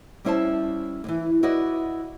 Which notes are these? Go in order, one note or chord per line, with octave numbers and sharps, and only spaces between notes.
G3 C#4 E4 C5 E5 A5
D#2 E3
E4 F#4 B4 D5 D#5